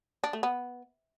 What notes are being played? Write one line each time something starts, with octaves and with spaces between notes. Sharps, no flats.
D4
A3
B3